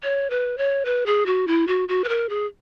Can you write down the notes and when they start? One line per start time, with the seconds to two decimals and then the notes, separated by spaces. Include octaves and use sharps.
0.03 C#5
0.30 B4
0.58 C#5
0.85 B4
1.06 G#4
1.26 F#4
1.47 E4
1.67 F#4
1.89 F#4
2.04 B4
2.09 A#4
2.29 G#4